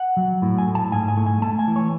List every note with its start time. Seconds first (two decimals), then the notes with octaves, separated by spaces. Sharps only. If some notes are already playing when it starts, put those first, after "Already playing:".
Already playing: F#5
0.17 F#3
0.42 A2
0.58 G#5
0.67 A2
0.75 A5
0.92 G#2 G#5
1.08 G#5
1.17 A3
1.26 G#5
1.42 A3 A5
1.59 G#5
1.68 E3
1.76 C#5